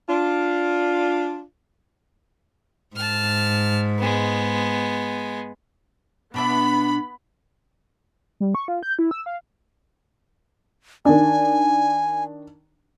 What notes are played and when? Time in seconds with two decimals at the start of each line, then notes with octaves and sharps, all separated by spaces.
0.09 D4 F4
2.96 G#2 A5 F6
3.99 G#3 B3
6.34 B2 B3 D4 E5 B5
8.40 G3
8.55 C#6
8.68 F4
8.83 G6
8.99 E4
9.11 E6
9.26 F5
11.05 D#3 D4 G#5